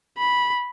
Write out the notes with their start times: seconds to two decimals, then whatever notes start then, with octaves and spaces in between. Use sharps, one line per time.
0.18 B5